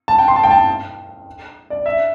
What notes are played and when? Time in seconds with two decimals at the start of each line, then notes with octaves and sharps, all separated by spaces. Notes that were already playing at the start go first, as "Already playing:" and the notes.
0.08 A5
0.19 G5
0.28 C6
0.36 A5
0.43 G5
0.51 A5
1.70 D5
1.86 E5